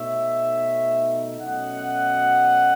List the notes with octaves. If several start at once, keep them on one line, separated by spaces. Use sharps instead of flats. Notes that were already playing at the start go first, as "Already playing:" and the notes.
Already playing: B2 A3 D#4 C#5 E5
B2 F#3 A3 C#4 D#5 F#5